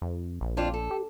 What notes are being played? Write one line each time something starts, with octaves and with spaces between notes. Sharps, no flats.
F2
A#1
F2 D4 F4
A4
G4